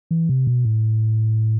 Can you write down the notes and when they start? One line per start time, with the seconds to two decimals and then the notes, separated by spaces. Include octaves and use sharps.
0.11 E3
0.29 C3
0.47 B2
0.65 A2